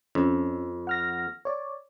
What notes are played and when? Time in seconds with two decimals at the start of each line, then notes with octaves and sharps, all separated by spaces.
0.15 F2 C#4
0.87 F#5 F6 A#6
1.45 C#5 D5